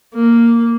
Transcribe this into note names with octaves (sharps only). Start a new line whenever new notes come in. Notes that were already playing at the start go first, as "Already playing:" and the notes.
A#3